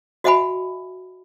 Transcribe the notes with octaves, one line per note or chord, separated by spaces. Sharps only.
F#4 D#5 E5 F#5 G#5 B5